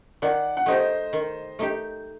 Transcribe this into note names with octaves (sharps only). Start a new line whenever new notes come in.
D#3 D5 F#5
F#5
A3 D#4 G4 C5 D#5
D#3
A3 D#4 G4